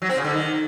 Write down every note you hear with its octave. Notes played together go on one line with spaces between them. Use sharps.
F#3
C4
C#3
D3
D#3